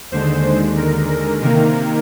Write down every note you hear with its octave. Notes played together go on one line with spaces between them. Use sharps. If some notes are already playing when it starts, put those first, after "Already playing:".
D#2 D3 G#3 C5
A#4
A#4
C3 D#3 A#3 A#4